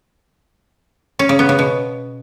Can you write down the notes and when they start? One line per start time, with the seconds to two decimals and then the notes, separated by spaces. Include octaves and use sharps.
1.19 C#4
1.29 C#3
1.39 B3
1.49 C#3
1.59 B2